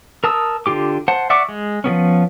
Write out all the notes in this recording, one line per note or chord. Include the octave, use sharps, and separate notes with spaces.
A#4 A5 D#6 E6
D3 F4 G4 D6
C5 F#5 A5
D5 E5 F#5 C#6 D6
G#3
F3 G3 B3 C#4